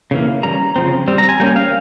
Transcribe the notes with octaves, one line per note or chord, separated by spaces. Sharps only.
C#3 E3 A#3
G3 C#4 A#5
C#3 F3 C4
G3 C4
A#5
G#5
G3 A#3 C#4 G5
F5